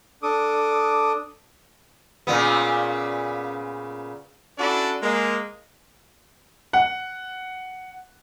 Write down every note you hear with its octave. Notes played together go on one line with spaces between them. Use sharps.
D4 A4 D6 D#6
A#2 C#3 B3
C#4 D4 E4 F#4 A4 D5
G#3 A#3
F#5